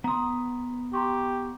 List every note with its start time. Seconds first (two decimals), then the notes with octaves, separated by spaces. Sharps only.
0.04 B3 A#5 C6 D#6
0.93 G4 A#5 C6 C#6